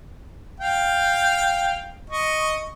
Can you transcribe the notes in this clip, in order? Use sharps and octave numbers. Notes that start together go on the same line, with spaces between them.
F5 G5
D#5 C#6